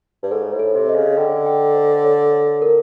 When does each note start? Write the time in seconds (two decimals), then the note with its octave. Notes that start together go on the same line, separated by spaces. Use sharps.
0.23 G2
0.31 G#2 A4
0.53 A2
0.59 A4
0.74 C3
0.89 D#5
0.95 C#3
1.17 D3 G5
1.46 G5
1.75 C5
2.04 C#5
2.33 C#5
2.62 A#4